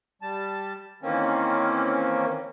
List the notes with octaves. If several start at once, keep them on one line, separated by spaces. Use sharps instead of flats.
G3 A5
D#3 E3 A#3 C4 C#4